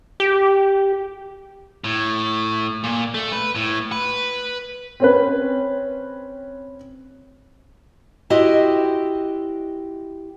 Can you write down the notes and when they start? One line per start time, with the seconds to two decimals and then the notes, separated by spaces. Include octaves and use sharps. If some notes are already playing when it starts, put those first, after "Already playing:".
0.20 G4
1.84 A2
2.84 A#2
3.14 A3
3.32 B4
3.55 A2
3.92 B4
5.00 C4 C#4 B4
8.30 E4 F#4 G4 C5 D#5